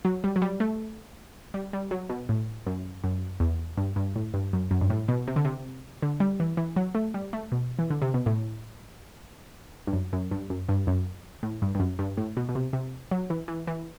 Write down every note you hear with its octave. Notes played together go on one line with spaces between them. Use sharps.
F#3
G3
F#3
G3
A3
G3
G3
F#3
B2
A2
F#2
F#2
E2
G2
G2
A2
G2
F#2
F#2
G2
A2
B2
C3
D3
C3
D3
G3
E3
E3
F#3
A3
G3
A3
B2
E3
D3
C3
B2
A2
G2
F#2
F#2
G2
F#2
G2
F#2
A2
G2
G2
F#2
G2
A2
B2
B2
C3
C3
F#3
E3
E3
E3